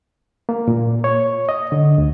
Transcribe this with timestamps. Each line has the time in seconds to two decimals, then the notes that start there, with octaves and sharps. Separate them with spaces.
0.49 A#3
0.68 A#2
1.04 C#5
1.49 D#5
1.72 D3
1.98 D2